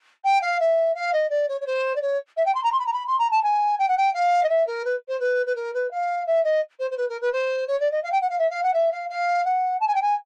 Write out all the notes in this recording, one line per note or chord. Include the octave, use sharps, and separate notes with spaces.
G5
F5
E5
F5
D#5
D5
C#5
C#5
C5
D5
C#5
E5
G5
C6
A#5
C6
B5
A#5
B5
C6
A#5
A5
G#5
G5
F#5
G5
F5
D#5
E5
A#4
B4
C5
B4
B4
A#4
B4
F5
E5
D#5
C5
C5
B4
A#4
B4
C5
C#5
D5
D#5
F5
G5
F#5
F5
E5
F5
F#5
E5
F5
F5
F#5
A5
G#5
G5
G#5